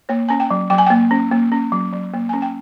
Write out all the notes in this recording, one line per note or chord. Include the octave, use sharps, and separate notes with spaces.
A#3 C#5
C#4 G#5
G5
F#3
F#3 G5
G#5
A#3 G5
C#4
A#3
C#4
F#3
F#3
A#3
C#4 G#5
G5